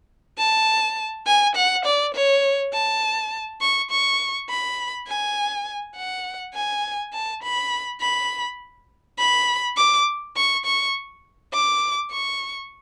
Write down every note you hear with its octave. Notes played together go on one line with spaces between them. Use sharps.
A5
G#5
F#5
D5
C#5
A5
C#6
C#6
B5
G#5
F#5
G#5
A5
B5
B5
B5
D6
C#6
C#6
D6
C#6